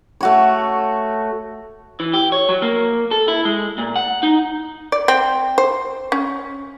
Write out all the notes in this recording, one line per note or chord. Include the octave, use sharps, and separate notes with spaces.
A3 F#4 C#5
E3
G4
C#5
F#3
A#3
A4
E4
G#3
A#2
F#5
D#4
D5
C4
C5
C#4